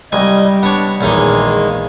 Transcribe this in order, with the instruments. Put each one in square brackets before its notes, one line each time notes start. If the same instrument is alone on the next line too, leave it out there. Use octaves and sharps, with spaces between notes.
[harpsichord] C2 G#5 [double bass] G3 [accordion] D#5
[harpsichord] B3 C#5 [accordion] D4
[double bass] A#1 [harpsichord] E2 C#4 D#4 [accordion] D#3 G#3 A#3